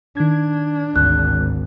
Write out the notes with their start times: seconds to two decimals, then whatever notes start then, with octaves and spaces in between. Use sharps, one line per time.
0.17 D#3 D4 G#6
0.96 G#1 D2 F#6